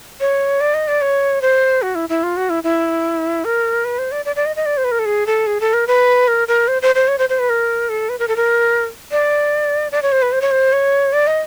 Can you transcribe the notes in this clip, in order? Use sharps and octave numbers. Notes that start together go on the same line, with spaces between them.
C#5
D5
D#5
D5
C#5
C5
F#4
E4
E4
F4
F#4
E4
E4
A#4
B4
C5
D5
D5
D5
D#5
D#5
D5
C5
B4
A#4
A4
G#4
A4
G#4
A4
A#4
B4
A#4
A#4
C5
C5
C5
C#5
C5
C5
B4
A#4
A4
B4
A#4
A4
A#4
D5
D5
C#5
C5
B4
C5
C#5
C5
C#5
D5
D#5